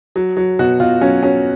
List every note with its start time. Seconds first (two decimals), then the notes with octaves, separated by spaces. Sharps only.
0.16 F#3
0.37 F#3
0.59 B2 F#4
0.80 B2 F4
1.01 F#3 C#4
1.23 F#3 C#4